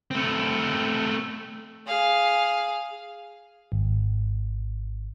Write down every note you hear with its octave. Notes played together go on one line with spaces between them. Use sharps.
A3 C4
G#4 F5
G#1